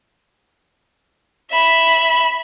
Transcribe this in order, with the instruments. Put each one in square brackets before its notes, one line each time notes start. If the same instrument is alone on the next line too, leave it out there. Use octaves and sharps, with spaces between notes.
[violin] E5 B5